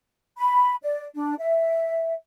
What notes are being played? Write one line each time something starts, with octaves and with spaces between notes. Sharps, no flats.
B5
D5
D4
E5